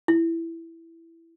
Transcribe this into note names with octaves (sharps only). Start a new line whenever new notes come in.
E4